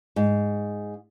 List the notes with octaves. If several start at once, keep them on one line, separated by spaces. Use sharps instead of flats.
G#2